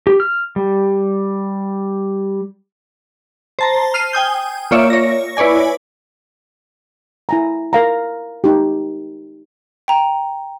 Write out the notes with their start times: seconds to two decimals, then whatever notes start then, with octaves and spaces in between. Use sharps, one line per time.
0.07 G4
0.20 F6
0.56 G3
3.59 C5 A5 A#5
3.94 F6 C7 D#7
4.13 G5 G#5 D#6 G6
4.71 A#3 F4 C#5 D5 E5
4.90 C#5 A#6
5.37 E4 B4 C#5 D5 G#5
7.29 E4 G#5 A#5
7.73 A#4 F5 A#5
8.44 D#4 G4
9.88 G5 A#5